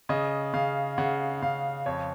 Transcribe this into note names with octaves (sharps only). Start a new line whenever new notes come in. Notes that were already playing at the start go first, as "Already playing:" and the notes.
C#3 D#5
C#3 F5
C#3 F#5
C#3 F5
F2 C#5